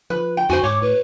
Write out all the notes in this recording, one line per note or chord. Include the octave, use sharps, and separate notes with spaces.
F3 B4
G5
F2 F#4 C5 G#5
G#2 C#5 D6
A2 B4